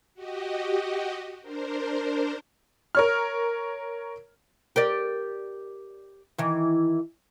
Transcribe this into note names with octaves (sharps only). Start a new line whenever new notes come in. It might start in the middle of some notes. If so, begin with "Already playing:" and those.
F#4 G4 D#5
D4 A#4 C5
A#4 C#5 F6
G4 A#4 D5
D#3 E3